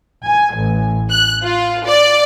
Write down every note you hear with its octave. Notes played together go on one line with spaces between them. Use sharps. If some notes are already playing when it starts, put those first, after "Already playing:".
G#5
A1
F#6
F4
D5